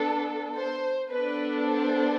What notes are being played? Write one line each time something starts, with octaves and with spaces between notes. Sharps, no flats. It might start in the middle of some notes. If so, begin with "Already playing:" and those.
Already playing: B3 D4 A4
C5
B3 D4 A4 B4
C5